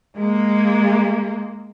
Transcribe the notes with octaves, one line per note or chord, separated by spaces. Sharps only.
G#3 A#3